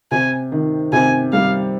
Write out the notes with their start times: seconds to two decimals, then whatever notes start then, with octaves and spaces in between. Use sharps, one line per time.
0.12 C3 G#5
0.52 D#3
0.93 C3 G#5
1.33 G3 F5